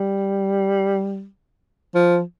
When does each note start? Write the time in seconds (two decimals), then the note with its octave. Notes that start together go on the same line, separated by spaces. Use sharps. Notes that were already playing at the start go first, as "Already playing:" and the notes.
Already playing: G3
1.95 F3